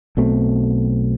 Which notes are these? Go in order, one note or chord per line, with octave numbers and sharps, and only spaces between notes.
B1 B2 A3 C4